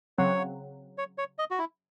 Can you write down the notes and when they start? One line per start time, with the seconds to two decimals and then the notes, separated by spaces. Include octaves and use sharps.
0.18 C#3 F#3 C4 C#5
0.98 C#5
1.18 C#5
1.38 D#5
1.51 F#4
1.59 E4